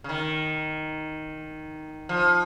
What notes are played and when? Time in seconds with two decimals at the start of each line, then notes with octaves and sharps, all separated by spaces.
0.04 C#3
0.09 D#3
2.09 F3